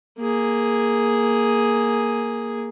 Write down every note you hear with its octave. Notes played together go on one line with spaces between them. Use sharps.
A#3 G#4